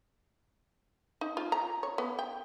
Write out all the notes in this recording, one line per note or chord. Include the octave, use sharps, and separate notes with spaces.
D#4
F4
A#5
C#5
B3
G5